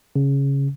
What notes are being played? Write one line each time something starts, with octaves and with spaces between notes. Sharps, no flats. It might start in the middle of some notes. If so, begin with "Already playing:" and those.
C#3